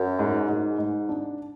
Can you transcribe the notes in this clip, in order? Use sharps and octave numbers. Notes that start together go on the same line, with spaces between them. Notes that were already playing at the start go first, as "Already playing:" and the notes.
Already playing: F#2
G#2
G#2
G#2
D4